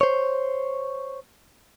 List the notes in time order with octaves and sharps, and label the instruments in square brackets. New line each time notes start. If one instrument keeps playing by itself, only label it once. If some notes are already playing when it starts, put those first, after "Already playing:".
[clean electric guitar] C5 C#5